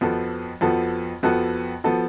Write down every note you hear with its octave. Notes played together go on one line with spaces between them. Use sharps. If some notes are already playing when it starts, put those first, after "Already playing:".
F2 F3 B3 F#4 A4
F2 F3 B3 F#4 A4
F2 F3 B3 F#4 A4
F3 B3 F#4 A4